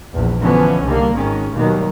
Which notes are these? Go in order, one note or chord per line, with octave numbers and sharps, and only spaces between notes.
A#1 E2
D3 E3 F3 B3 C#4
C2 D3 D#3 G3 A#3
G#1 G#2 D#3 G#3 C#4
D#2 B2 D#3 F#3 G3 A#3